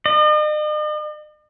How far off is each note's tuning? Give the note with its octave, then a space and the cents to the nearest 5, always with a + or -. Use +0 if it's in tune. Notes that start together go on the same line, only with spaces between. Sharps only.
D#5 -45